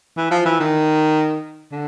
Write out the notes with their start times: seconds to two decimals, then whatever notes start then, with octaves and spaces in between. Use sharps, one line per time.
0.17 E3
0.31 F3
0.45 E3
0.60 D#3
1.72 D3